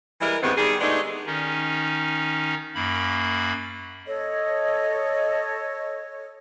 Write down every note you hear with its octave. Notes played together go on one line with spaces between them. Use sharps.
E3 G3 G#3 E4 A#4
G2 D#3 E3 G#3 B3 C4
D#3 G3 G4 G#4
G#3 A3 B3 D4 D#4 G4
D#3 C#4 D#4
F#2 A#3 B5
A4 C#5 D#5